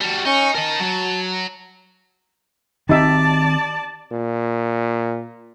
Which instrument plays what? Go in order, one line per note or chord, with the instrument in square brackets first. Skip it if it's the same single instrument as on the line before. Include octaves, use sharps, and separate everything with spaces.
[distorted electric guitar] G3 F#4 [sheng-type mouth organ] A5
[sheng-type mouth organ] C#4 C#6 G6 [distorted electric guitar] D#4
[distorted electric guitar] A#4 D#5 [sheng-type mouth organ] A5
[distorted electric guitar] F#3
[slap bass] D#3 C4 [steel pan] D#4 G4 E5 [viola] D5 A5
[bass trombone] A#2